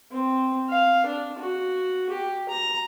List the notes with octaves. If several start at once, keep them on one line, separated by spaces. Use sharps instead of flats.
C4
F5
D4
F#4
G4
A#5